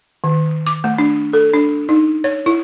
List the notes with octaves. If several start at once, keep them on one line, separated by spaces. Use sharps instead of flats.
D#3
D6
A3
D4
A4
D4
D#4
C#5
E4